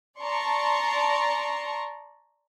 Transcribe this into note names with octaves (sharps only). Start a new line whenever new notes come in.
D5 A5 A#5 C6 C#6